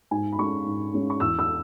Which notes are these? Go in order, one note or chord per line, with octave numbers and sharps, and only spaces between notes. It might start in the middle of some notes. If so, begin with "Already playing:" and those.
G#2 G#5
B5
G#3 C#4 C#6
G#2
G#3 C#4
C#6
E2 E6
E6